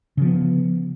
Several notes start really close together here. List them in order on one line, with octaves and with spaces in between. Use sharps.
C#3 F3 B3